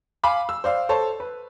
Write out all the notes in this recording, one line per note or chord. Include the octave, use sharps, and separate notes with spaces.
F5 G#5 B5 D6
E6
C5 D5 F5
A4 C5 C#5 A5
B4